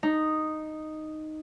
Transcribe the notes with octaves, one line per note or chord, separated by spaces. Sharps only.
D#4